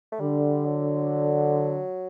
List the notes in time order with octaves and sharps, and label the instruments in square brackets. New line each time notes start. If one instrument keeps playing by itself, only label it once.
[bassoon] A3
[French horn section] D3 [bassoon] G3
[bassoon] F#3